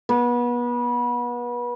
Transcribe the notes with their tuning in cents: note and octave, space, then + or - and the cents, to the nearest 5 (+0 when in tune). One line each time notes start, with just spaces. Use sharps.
B3 -30